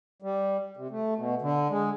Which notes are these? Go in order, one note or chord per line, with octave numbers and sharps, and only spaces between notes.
G3
C3
A3
B2
D3
G#3